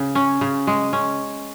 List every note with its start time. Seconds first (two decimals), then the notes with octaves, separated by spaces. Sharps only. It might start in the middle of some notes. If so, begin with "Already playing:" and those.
Already playing: C#3
0.15 C#4
0.41 C#3
0.67 G#3
0.93 C#4